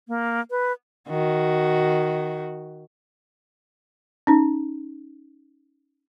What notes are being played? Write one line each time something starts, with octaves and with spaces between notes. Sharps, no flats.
A#3
B4
D#3 F#4
C#4 D#4